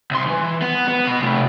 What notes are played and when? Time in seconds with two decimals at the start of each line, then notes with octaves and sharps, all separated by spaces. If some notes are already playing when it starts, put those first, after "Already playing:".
0.11 C2 C6
0.28 E3
0.62 B3
0.88 B3
1.06 B2 B5
1.21 C3 A3